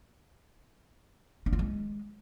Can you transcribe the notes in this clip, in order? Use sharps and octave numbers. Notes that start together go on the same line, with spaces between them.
D4
F4
G#3